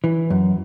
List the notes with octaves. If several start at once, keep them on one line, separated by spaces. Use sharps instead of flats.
E3
F#2